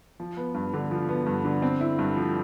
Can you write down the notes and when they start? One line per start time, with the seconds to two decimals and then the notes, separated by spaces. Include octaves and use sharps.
0.20 F3
0.37 B3
0.55 G2
0.74 D3
0.91 F3
1.09 B3
1.26 G2
1.45 D3
1.62 C4
1.81 E4
1.99 G2
2.16 F3